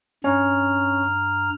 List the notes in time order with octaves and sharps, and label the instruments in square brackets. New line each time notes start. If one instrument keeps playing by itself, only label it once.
[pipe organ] G2 A#5 F6 [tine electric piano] C#4 C#5